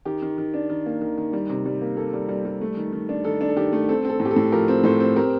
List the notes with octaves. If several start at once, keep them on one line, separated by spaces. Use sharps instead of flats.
D#3 G4
D#3
D#3
D4
D#3
A#3
D#3
D#3
G3
C3
G3
A#3
A#3 A4
G3
G3
G3
A3
D#3
D#3
D4
D#3 A4
D4
A4
D#3 G4
A3
C4 A4
C4 A4
A2
G4
A4
A2
F3 G4 A#4
C4
A2 A4 C5
C4
C4 G4 A#4